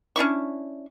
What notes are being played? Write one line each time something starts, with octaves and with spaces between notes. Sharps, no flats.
C#4 D4 E4 C#6